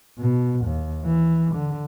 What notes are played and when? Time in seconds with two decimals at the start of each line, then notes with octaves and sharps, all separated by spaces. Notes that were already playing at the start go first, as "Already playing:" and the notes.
0.19 B2
0.65 D#2
1.04 E3
1.55 D3